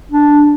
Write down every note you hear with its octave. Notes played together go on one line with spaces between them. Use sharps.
D4